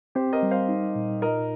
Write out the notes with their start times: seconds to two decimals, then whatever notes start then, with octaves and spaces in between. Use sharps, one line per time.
0.15 C4 G4 C5
0.33 A#4 D#5
0.43 G3
0.51 C5 F5
0.68 D#4
0.95 A#2
1.22 F4 A#4 D#5